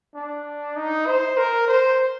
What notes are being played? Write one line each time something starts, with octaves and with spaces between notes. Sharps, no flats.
D4
D#4
C5
A#4
C5